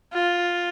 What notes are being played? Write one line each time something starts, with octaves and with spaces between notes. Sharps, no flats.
F4